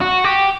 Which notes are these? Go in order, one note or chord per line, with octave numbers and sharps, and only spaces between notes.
F#4
G4